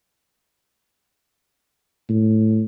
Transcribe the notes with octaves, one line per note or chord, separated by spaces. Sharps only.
A2